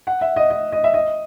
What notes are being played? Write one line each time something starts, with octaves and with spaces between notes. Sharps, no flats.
F#5
E5
D#5
D#5
D#5
E5
D#5